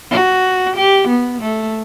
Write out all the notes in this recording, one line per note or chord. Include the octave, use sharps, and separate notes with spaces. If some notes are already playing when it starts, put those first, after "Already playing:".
F#4
G4
B3
A3